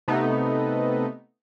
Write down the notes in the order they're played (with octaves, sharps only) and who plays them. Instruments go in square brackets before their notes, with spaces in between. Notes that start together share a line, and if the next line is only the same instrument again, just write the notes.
[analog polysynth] C3 A3 B3 D#4